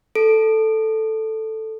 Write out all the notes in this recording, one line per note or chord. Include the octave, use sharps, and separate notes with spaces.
A4 D7